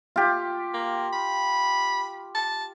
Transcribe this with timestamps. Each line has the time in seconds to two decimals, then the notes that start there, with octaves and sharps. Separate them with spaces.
0.16 F4 G4
0.74 A#3
1.13 B5
2.35 A5